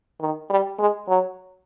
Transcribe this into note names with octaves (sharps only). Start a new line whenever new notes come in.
D#3
G3
G#3
F#3